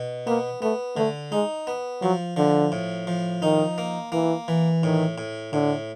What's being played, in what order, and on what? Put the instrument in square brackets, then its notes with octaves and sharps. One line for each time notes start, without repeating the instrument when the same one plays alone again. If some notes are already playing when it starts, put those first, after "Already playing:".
Already playing: [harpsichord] B2
[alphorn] A#3 [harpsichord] B3
[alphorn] A3 [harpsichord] B3
[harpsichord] D3 [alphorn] A3
[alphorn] G#3 [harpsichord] D#4
[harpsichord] B3
[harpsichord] F3 [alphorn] F#3
[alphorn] D3 [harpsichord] F3
[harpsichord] A2
F3
[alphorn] D#3 [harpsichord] D#4
[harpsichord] A#3
[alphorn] E3 [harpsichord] A#3
[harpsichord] E3
[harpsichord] A2 [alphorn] D#3
[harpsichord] A2
[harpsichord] A2 [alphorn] D3